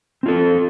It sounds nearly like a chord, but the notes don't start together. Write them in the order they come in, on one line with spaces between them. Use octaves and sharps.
C4 F4 A4